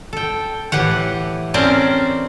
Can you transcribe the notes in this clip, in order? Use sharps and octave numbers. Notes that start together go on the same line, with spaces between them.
A4 G5
A2 E3 G4 F#5
C4 C#4 A#4 C5 D5 A5